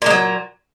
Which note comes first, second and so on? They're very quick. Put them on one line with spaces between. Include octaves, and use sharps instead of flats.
A#2 G#3 F#3